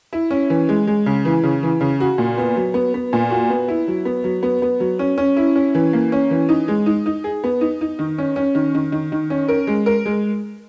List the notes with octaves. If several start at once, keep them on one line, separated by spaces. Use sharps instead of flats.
E4
C#4
E3
G#3
G#3
C#3
E3
C#3
E3
C#3
F#4
A#2
B3
F#3
B3
B3
A#2
F#4
B3
E4
F#3
B3
F#3
B3
B3
F#3
C#4
C#4
E4
C#4
E3
A#3
C#4
E3
D#4
G#3
D#4
D#4
G#4
B3
D#4
D#4
D#3
C#4
C#4
D#3
D#3
D#3
D#3
C#4
A#4
G#3
A#4
G#3